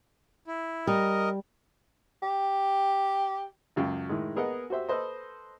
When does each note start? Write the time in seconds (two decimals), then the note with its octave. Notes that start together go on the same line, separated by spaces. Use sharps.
0.47 E4
0.87 G3 A#4 D#5
2.23 G4
3.76 C#2 F#2 F5 G5
4.09 A2 D#3 G#3
4.36 B3 G#4 A#4 B4 D#5 F#5
4.70 F#4 G4 C5 E5
4.89 A4 B4 C5 D#5